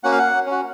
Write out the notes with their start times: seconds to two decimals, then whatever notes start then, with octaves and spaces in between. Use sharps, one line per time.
0.04 A#3 C#4 F#4 F#5
0.12 F5
0.19 F#5
0.46 C#4
0.51 F#4